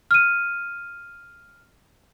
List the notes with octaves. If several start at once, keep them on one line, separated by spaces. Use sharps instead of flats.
F6 D#7